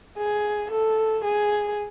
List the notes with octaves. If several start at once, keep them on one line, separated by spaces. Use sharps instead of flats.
G#4
A4
G#4